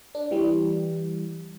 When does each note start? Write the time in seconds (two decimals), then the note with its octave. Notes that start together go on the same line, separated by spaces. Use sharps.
0.15 D4
0.31 E3 G3